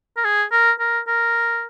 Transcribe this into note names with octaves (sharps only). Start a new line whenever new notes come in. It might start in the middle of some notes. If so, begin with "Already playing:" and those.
A#4
G#4
A#4
A#4
A#4